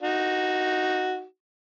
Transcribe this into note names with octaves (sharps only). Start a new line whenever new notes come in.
D#4 F#4